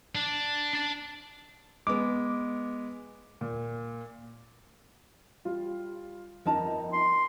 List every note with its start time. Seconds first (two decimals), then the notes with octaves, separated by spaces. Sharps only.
0.15 D4
0.73 D4 A5
1.87 G#3 B3 D6
3.41 A#2
5.45 G3 F4
6.46 G1 F2 D#4 A#4 A5 A#5
6.93 C6